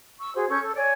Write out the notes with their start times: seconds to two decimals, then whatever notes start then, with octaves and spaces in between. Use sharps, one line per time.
0.19 C#6 E6
0.34 F#4 G#4 C5
0.49 C#4 A4 C#6 G6
0.62 A4
0.75 C#5 D5 G#5